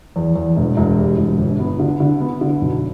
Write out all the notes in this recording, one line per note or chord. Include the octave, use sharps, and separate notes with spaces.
E2
E2
E1
E1
G3
E1
G1
B3
D3
D3
B3
D3
B1